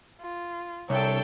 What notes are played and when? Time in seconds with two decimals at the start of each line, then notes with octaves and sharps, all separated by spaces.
0.21 F4
0.90 C2 D4 A4 C#5 E5 G5